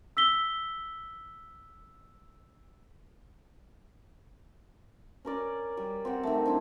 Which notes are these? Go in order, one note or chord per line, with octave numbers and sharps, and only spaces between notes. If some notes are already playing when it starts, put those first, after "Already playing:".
E6 B6 G7
C#4 A#4 D5
G3
C4 G4 F#5
D#3 A3
C4 D4 E4